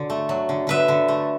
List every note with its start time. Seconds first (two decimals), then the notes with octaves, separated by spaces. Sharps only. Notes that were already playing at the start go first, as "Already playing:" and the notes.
Already playing: D3 F#3 D5
0.10 A3
0.29 F#3
0.49 D3
0.67 D3 B4 E5
0.88 D3
1.08 A3